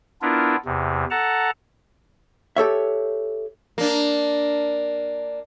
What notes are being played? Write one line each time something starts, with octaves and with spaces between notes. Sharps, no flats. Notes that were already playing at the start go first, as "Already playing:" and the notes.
B3 D4 E4 F4 A#4
E2 C3
A4 F#5 A5 A#5
G4 A4 C#5 E5
A#3 D4